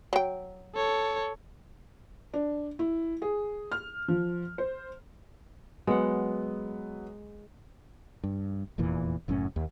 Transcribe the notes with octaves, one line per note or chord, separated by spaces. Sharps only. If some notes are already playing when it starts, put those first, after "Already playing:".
F#3 G5
A4 C#5
D4
E4
G#4
F6
F3
C5
F#3 G#3 B3 F#5
G2
F1 E2 A#2 E3
F#1 F#2 A2 C#4
D#2